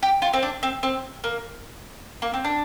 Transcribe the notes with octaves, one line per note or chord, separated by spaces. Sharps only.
G4
F4
C4
D4
C4
C4
A#3
A#3
C4
D4